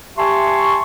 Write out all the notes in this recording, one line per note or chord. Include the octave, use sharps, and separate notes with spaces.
G4 E5 G#5 A5 C6 C#6